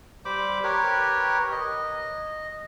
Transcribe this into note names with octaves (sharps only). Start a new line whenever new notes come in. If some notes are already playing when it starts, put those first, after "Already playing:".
G3 C5 B5 D6
G4 A#4 B4 C#5
D#5